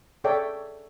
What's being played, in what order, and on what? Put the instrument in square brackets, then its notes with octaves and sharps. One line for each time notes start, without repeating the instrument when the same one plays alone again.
[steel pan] G#4 A4 C#5 D5 E5 G5